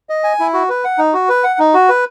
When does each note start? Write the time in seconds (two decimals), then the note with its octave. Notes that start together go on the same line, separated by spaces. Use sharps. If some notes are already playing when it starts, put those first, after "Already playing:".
0.09 D#5
0.24 G#5
0.40 E4
0.54 F#4
0.69 B4
0.84 F#5
0.98 D#4
1.13 F#4
1.29 B4
1.44 F#5
1.59 D#4
1.74 F#4
1.89 B4